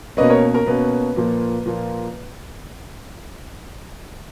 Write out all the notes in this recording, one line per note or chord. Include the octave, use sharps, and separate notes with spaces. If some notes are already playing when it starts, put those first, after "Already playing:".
B2 A#3 C#4 B4 D#5
A#4 C#5
A#4
B2 A#3 C#4 B4
A#2 F3 A#3
A#2 F3 A#3